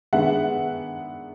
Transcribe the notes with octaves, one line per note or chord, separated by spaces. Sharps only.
D#3 G#3 B3 D4 E5 F#5